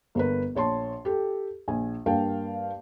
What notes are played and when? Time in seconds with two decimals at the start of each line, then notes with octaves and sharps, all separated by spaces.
0.15 G1 A#4 B4
0.55 A#1 C#5 A5 C6
1.05 G4 A4
1.68 A#1 G#5
2.06 G2 A#3 F5 G5 A5